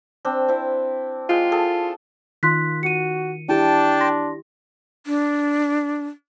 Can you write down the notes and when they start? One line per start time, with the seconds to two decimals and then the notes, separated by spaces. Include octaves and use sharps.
0.25 C4 D4
0.48 C4 E4
1.29 G#3 F4 G5
1.52 G#4 A4 A5
2.43 D#3 F4 C6 F#6 B6
2.83 F#4 C#7 D#7
3.49 D4 E4 G4 G5 A5
4.01 C6 A#6
5.06 D4